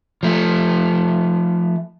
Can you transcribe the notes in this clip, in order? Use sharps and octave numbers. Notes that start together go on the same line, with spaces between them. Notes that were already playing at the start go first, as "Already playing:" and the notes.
F3 A3